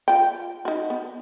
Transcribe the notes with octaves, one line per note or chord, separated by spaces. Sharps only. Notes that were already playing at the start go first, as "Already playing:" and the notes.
F4 G5
D#4 F#4
B3